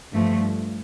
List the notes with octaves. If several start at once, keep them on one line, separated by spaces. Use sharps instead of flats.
G2 F3 A3